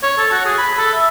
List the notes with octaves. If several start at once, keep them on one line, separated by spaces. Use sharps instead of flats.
C#5
A4
F#4
G#4
B5
A4
E5